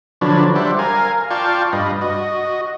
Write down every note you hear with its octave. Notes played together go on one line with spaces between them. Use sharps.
D3 F3 F#3 D4 B4 C#5
G3 C5 D5 E5 F#5
A#4 F5 G#5
F4 D5 F5 G5 A5 C#6
G2 B4 D#5
F#4 D#5